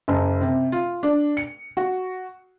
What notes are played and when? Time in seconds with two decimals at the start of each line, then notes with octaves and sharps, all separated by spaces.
0.08 F#1
0.41 C3
0.72 F4
1.03 D4
1.37 C#7
1.77 F#4